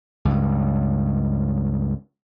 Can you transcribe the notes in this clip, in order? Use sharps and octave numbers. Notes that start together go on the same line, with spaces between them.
C#2 G2